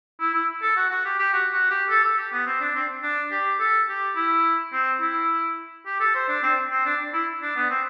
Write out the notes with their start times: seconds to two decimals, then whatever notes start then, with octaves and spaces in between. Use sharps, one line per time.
0.20 E4
0.34 E4
0.62 A4
0.76 F#4
0.91 F#4
1.05 G4
1.19 G4
1.33 F#4
1.52 F#4
1.70 G4
1.90 A4
2.04 A4
2.18 G4
2.32 B3
2.46 C4
2.60 D4
2.75 C4
3.03 D4
3.31 G4
3.60 A4
3.89 G4
4.16 E4
4.73 C4
5.01 E4
5.86 G4
6.00 A4
6.14 C5
6.29 D4
6.43 C4
6.71 C4
6.85 D4
7.14 E4
7.42 D4
7.56 B3
7.70 C4